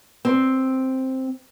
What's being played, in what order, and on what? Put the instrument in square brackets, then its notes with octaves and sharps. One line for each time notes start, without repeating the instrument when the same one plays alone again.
[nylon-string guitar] C4